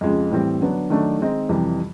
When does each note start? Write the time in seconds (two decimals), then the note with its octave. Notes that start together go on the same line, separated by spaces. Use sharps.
0.01 F2 C#3 F3 G#3
0.31 A2 E3 G3 C4
0.61 D3 F#3 B3 D4
0.90 D#3 F#3 A3 D4
1.19 D#3 G#3 C4 D#4
1.49 F2 C3 E3 G3